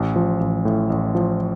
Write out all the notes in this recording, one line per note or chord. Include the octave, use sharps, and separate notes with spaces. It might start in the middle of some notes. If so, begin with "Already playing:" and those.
Already playing: A1
F3
A1
A2
A1
F3